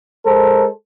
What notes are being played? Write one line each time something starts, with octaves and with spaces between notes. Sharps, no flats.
G#3 A4 A#4 C5